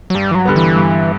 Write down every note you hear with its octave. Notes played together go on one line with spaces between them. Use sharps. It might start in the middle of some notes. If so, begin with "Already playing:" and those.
F#3
G2 G3
E3
F#3
D3 G3 B3
E3
G2